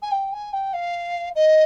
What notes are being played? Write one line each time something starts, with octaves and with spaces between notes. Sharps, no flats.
G#5
G5
G#5
G5
F5
D#5